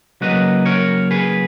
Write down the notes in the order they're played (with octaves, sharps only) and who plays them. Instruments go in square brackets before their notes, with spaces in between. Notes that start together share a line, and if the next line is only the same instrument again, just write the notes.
[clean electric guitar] C#3 F#3 A#3 B4 D#5
A#4 C#5
G#4 B4